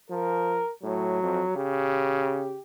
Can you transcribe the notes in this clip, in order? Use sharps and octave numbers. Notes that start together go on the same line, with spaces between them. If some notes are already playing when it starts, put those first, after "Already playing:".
F3 A#4
A2 F#3
F2
C#3 G4